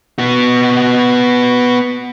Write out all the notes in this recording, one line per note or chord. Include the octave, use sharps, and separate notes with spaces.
B3 F#4